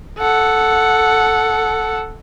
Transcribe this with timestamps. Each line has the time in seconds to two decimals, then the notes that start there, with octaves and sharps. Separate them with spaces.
0.18 A4 F#5